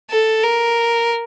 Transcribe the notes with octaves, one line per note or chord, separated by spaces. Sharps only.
A4
A#4